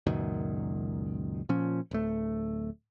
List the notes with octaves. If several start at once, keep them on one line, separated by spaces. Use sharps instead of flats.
C#2 F#2 A#2 D#3
A#2 F3 C#4
D1 A3